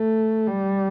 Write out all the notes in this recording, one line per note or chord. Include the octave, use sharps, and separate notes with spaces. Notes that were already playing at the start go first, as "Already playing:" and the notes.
Already playing: A3
G3